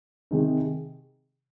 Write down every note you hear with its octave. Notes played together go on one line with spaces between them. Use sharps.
C3 D#3 G#3 D#4